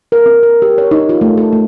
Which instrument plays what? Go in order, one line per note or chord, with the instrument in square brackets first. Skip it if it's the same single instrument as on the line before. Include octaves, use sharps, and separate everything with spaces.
[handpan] A#4
C4
A#4
G4
C#5
D#4
F4
A3
A4
A3